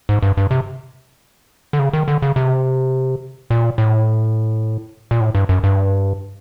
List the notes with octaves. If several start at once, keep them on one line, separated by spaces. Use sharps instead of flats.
G#2
G2
G2
C3
D3
C#3
D#3
D3
C#3
C3
A#2
A2
A#2
A2
G2
F#2
G2